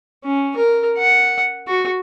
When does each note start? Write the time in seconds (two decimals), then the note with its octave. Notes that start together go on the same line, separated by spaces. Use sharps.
0.24 C#4
0.57 A#4
0.98 F#5
1.67 F#4